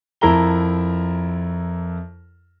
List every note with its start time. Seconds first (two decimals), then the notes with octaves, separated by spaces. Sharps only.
0.21 F2 E4 A#4 A5 A#5 G7